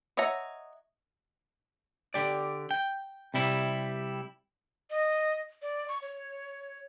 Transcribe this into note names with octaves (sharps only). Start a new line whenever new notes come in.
C#5 D#5 E5 F#5 A#5
D3 G4 D5
G5
C3 G3 E4
D#5
D5
C#6
C#5